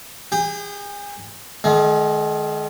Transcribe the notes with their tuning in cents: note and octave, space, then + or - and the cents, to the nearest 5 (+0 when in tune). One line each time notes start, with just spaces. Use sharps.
G#4 -35 G5 +0
D#3 -25 G#3 +40